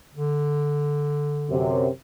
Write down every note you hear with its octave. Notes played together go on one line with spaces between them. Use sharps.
D3
F#2 C3